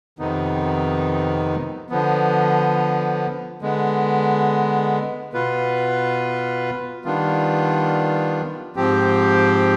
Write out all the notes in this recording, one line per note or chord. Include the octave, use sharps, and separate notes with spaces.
F2 C3 D#3 B3 D#4
D3 F3 B3
D3 G#3 B3
B2 B3 F4 B4
D#3 G3 B3 D4 F4
G#2 F3 C4 G4